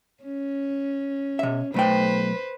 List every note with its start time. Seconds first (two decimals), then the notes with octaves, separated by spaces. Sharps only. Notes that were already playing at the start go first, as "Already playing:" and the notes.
0.24 C#4
1.39 B2 E5
1.74 B1 A3 B4 C5 G5